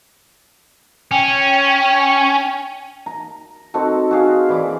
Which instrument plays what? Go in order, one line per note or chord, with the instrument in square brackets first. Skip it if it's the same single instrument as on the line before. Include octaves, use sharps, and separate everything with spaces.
[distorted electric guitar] C#4 [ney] G5
[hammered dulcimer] A#5
C4 D#4 F#4 A4
F#4 G#4 F5
E3 E4 D5 D6